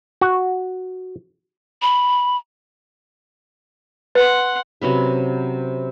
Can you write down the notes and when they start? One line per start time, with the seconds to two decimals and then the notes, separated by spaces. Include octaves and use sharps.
0.21 F#4
1.82 B5
4.15 B4 F#5 C6
4.81 C3 F#3 C#4 B4